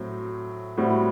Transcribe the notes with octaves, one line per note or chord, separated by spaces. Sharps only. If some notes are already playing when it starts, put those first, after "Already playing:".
Already playing: A2 F#3 C4
A2 G3 C4 F#4